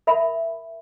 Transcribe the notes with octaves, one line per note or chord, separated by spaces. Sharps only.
A#4 E5 B5